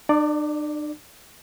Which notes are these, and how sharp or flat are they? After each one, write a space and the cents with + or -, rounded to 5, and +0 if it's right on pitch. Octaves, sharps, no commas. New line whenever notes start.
D4 +45 D5 +0